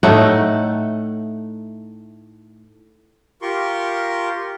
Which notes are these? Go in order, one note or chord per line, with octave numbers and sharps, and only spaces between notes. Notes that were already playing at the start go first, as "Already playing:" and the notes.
A2 A3 D#4 F#5
F4 G4 A#4 C6 C#6